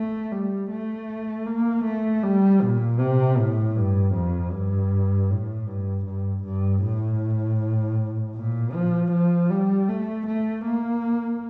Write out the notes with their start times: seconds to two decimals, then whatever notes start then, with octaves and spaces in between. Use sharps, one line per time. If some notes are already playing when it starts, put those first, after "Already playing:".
Already playing: A3
0.32 G3
0.71 A3
1.46 A#3
1.85 A3
2.23 G3
2.62 A#2
3.00 C3
3.39 A2
3.76 G2
4.15 F2
4.53 G2
5.30 A2
5.67 G2
6.06 G2
6.44 G2
6.84 A2
8.35 A#2
8.74 F3
9.12 F3
9.51 G3
9.89 A3
10.28 A3
10.66 A#3